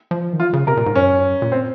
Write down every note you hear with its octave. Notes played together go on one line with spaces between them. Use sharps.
F3
D#3
F3 F4
C#3
C3 A#4
A#2
G#2
F#2 C#4
A#2
C4